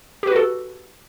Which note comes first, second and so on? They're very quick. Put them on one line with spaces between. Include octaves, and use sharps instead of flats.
G4 B4 F#4 A4